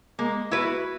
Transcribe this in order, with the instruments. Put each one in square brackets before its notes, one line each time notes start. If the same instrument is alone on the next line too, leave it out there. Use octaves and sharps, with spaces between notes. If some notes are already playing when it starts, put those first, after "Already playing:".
[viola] G#3 [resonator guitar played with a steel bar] A#3
[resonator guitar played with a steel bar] E4 B4 [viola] F#4